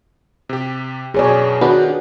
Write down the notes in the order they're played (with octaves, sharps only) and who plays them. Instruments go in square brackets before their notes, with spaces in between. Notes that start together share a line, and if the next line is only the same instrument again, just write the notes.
[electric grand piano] C3 G4
[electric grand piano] F#2 B2 [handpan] G#4 C#5 D5
[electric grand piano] D#3 [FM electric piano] B3 D4 [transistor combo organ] F#4